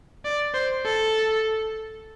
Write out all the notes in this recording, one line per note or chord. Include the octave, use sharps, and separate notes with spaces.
D5
C5
A4